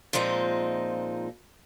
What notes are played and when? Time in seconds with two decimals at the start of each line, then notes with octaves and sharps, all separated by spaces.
0.13 A#2 F3 G#3 C4 D#4